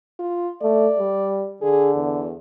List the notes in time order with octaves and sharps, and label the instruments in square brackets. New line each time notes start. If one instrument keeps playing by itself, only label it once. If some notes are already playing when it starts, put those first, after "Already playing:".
[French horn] F4
[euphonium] A3 [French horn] D5
[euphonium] G3
[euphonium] D3 [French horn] G#4
[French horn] E2